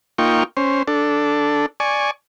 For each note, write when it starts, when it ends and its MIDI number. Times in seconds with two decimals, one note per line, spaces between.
0.18 0.43 58
0.18 0.43 63
0.18 0.43 65
0.18 0.43 79
0.18 0.43 85
0.57 0.83 61
0.57 0.83 72
0.88 1.66 62
0.88 1.66 69
1.80 2.11 74
1.80 2.11 80
1.80 2.11 85